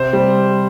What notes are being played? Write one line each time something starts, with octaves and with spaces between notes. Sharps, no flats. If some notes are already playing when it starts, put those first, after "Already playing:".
Already playing: C3 C5
G3